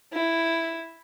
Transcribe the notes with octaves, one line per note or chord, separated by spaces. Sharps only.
E4